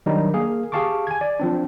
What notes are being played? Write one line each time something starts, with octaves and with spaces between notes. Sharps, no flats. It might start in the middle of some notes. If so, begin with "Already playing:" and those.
D#3 F#3 G3 D4 D#4
A#3 G#4 F5
G4 G#4 F5 A5 C#6 D6
G#5 G#6
D5
F3 C4 D4